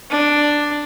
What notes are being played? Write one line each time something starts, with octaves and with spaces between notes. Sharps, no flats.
D4